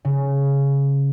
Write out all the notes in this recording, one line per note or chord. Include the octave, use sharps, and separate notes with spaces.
C#3